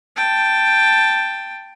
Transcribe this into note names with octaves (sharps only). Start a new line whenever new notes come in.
G5 A5